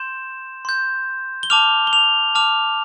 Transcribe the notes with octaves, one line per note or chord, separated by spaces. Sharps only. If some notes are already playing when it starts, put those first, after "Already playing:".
Already playing: C6 G6 E7
C6 G6
G7
A5 D6 F6 F7
G7
F7
A5 D6 F6 F7